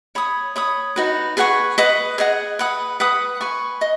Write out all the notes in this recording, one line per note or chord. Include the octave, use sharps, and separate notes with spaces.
C#5 B5 D#6
C#5 B5 D#6
D#4 F#4 B4
G#4 B4 F#5 C#6
B4 D#5 F#5
G#4 D#5 F#5
B4 F#5 D#6
B4 F#5 B5 D#6
B4 G#5 C#6
D#5